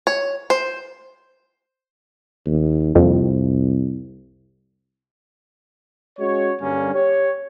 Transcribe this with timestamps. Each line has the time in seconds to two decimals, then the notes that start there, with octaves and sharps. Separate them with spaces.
0.07 C#5
0.50 C5
2.46 D#2
2.95 C2 F2
6.19 G#3 C#4 F#4 C#5
6.60 G2 D3 G3 A#3 C#4
6.93 G4 C#5